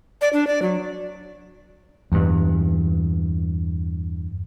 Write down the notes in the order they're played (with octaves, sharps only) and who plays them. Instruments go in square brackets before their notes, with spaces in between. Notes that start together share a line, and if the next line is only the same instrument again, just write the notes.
[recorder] D5
D4
D5
F#3
[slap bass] E2 G2